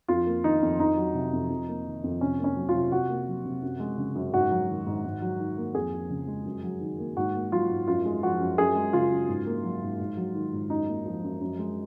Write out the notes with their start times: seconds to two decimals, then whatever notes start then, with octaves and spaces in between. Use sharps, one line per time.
0.08 F2 F4
0.26 A#3
0.44 D#3 D#4
0.62 F2
0.79 F2 D#4
0.97 F#3
1.14 C3
1.33 F2
1.50 F2
1.68 A#3
1.86 D#3
2.04 F2
2.21 C3 C#4
2.39 A#3
2.44 C#4
2.56 F#3
2.69 F4
2.74 C3
2.91 C3 F#4
3.09 A#3
3.28 F#3
3.45 C3
3.62 F#2
3.80 G#3
3.98 C#3
4.15 F#2
4.33 G#2 F#4
4.51 F#3
4.69 D#3
4.87 G#2
5.05 G#2
5.22 F#3
5.40 D#3
5.57 A#3
5.75 F2 G#4
5.92 F3
6.10 C#3
6.27 G#3
6.46 F#2
6.63 F#3
6.81 D#3
6.99 A#3
7.17 G#2 F#4
7.34 A#3
7.52 F#3 F4
7.70 G#2
7.88 F#2 F4
8.05 G#3
8.23 F3 F#4
8.41 F#2
8.58 F#2 G#4
8.75 G#3
8.93 C#3 F4
9.11 F#2
9.28 G#2
9.46 A#3
9.64 F#3
9.82 G#2
10.00 G#2
10.17 F#3
10.35 D#3
10.53 G#2
10.70 F#2 D#4
10.88 A#3
11.05 F3
11.23 F#2
11.41 F#2
11.59 G#3